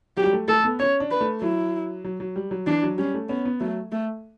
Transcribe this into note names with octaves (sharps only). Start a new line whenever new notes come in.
F#3 G4
G3
A3
A3 A4
B3
C#4 C#5
D4
B4
A3
F#3 E4
F#3
F#3
G3
F#3
E3 D4
F#3
G3 C#4
A3
B3 C#4
B3
F#3 A3
A3